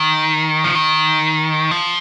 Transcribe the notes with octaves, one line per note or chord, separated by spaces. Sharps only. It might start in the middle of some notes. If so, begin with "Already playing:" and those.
Already playing: D#3
F3
D#3
F3